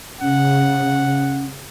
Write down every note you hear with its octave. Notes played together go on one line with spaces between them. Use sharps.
C#3 C#4 F#5